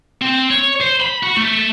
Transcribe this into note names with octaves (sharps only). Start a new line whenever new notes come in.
C4
C#5
C5
B5
F#4
A3